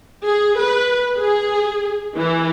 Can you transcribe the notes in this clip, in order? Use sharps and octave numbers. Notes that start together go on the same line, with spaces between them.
G#4
B4
G#4
E3